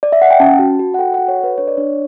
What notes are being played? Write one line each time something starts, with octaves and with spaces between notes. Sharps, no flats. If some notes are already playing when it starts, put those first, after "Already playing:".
D5
E5
F#5
G5
C#4 A5
F#4
F#4
F#5
A4 G5
F#4 F#5
C#5
A4 B4
D4 C#5
D5
D4 C#5